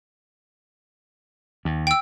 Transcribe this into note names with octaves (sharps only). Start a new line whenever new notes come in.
D#2
G5 E6